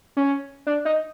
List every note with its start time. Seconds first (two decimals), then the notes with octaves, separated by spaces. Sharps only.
0.17 C#4
0.67 D4
0.85 D#4